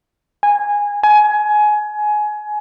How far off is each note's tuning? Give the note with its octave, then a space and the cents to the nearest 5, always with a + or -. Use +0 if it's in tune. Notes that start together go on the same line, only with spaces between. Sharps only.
G#5 -15
G#5 +20